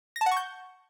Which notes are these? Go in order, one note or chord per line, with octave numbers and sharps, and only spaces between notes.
A#6
A5
F#5
C#6
G6